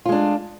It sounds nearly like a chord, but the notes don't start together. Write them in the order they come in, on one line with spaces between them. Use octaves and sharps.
F4 G#3 D4